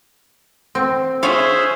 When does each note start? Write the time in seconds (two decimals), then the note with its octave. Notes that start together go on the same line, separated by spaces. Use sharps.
0.75 C4
1.23 F4 G#4 C5 C#5 E5 F5